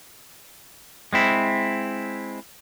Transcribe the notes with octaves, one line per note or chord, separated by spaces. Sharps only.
G#3 C4 E4